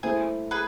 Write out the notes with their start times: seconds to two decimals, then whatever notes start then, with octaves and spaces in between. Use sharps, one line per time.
0.03 A3 E4 G#4 A4 C5
0.51 G#4 B4